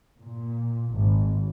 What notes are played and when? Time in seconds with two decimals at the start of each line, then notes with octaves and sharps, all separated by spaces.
0.21 A#2
0.95 G#1